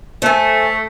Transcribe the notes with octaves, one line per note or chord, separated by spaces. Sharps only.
A3 C5 G#5